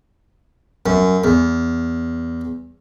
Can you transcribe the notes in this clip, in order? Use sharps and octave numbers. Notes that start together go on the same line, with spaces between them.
F#2
E2